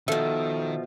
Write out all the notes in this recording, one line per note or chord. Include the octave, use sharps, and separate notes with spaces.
B2 D#3 F3 A4 E5 E6